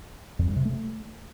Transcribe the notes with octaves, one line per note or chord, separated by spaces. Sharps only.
F2
G2
C3
A3